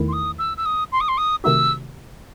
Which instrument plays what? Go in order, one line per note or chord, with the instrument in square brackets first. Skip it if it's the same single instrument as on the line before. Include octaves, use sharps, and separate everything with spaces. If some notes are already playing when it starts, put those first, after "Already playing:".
Already playing: [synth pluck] E2 D#3 A3 E4
[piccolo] C6
D#6
E6
E6
D#6
C6
D#6
C6
D#6
[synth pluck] C3 D#3 A3 D#4 F#4 [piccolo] E6